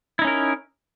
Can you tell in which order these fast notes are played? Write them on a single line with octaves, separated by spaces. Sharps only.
E4 D#4 C#4 A#4